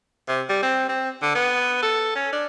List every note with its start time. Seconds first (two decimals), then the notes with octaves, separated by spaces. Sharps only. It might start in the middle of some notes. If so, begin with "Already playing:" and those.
0.28 C3
0.49 G3
0.62 C4
0.89 C4
1.22 D3
1.35 B3
1.83 A4
2.15 C#4
2.33 D4